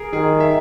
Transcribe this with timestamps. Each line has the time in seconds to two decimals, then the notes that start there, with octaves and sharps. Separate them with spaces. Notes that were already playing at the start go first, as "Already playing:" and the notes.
Already playing: G#4 A#4
0.13 D#3 G#4
0.40 E5